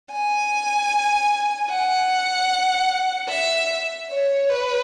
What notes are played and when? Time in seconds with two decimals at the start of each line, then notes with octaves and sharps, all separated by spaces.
0.12 G#5
1.70 F#5
3.29 E5
4.10 C#5
4.49 B4